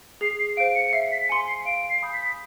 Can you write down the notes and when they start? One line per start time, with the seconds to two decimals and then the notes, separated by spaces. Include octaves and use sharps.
0.21 G#4 C7
0.39 C7
0.57 C5 F5 D7
0.75 C#7
0.86 C#7
0.93 E5 C7
1.11 B6
1.29 G#5 C6 C#7
1.47 C7
1.65 F5 D7
1.90 C7
2.02 G#5 B5 D#6 G6
2.13 B6